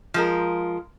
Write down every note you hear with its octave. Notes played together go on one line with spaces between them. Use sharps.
F3 G#3 A#4